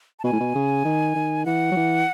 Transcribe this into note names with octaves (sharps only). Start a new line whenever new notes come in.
A5
B2 G#5
A2
B2
C#3
D#3
D#3
E3 F#5
F#3
E3